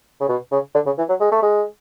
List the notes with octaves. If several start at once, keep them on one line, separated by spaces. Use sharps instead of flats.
C#3
B2
C#3
D3
C#3
E3
F#3
G#3
A3
G#3